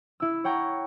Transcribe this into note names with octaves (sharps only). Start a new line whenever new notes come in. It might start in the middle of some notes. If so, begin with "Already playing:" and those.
E4 E6
C#5 F#5 G5 A#5 C#6